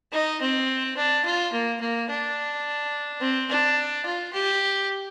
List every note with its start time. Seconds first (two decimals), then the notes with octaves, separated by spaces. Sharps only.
0.12 D#4
0.41 C4
0.97 D4
1.24 F4
1.53 A#3
1.80 A#3
2.09 D4
3.21 C4
3.49 D4
4.05 F4
4.33 G4